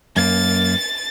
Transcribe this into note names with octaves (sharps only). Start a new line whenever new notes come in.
F#2 A#3 A6